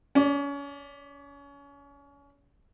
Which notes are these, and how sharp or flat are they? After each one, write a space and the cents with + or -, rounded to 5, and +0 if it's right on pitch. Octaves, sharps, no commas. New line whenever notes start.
C#4 +30 D5 +0